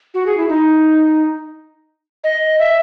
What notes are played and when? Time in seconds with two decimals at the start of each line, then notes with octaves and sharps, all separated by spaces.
0.14 F#4
0.26 G#4
0.37 E4
0.49 D#4
2.24 D#5
2.59 E5